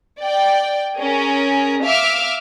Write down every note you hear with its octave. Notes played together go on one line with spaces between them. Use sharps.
D5 G5
C#4 G#4 A#4
E5 F5 D6 E6 F6